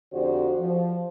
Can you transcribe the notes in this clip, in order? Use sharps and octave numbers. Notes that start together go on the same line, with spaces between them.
F2 D3 F#4 G4 C5 D5
F3